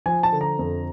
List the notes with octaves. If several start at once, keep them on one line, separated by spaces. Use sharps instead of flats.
F3 G#5
A5
D3
A#5
F2